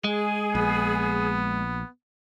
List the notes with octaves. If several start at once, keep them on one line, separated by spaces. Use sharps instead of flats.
G#3 G#4
A#1 B3